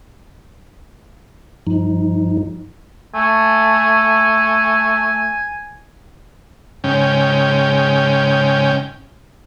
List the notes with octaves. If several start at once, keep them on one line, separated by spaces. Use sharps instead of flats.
G2 F3 D#4
A3 G#5
G#2 C#3 C#4 G5